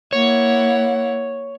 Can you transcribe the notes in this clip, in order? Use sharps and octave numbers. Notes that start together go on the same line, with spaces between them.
A#3 E4 C#5 F#5